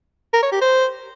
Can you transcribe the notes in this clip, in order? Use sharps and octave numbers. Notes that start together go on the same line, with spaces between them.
A#4
C#5
G4
C5